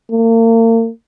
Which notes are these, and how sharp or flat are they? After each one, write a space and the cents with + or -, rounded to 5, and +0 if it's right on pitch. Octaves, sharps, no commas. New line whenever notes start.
A#3 -40